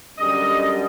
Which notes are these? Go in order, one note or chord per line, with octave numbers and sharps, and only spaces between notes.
F#2 D3 G3 D#5